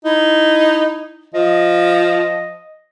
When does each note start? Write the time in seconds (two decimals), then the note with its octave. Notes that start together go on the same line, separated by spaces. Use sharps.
0.05 D#4 E4
1.34 F3 D#5